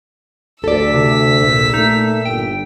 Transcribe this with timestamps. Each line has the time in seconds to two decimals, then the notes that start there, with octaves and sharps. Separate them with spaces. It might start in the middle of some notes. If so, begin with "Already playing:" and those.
0.64 D2 A4 D5 E6 B6
0.94 C3
1.42 A#1 A#2
1.74 A3 D#4
2.25 G1 G5